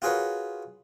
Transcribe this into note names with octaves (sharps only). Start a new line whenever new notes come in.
F4 F#4 G#4 A#4 B4 C#5